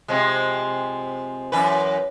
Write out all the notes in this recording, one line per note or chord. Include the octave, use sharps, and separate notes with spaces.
C3 F3 G#3
F#2 E3 B4